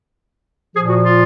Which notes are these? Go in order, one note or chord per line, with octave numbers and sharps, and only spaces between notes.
A#2 F3 G#4
F#4
F4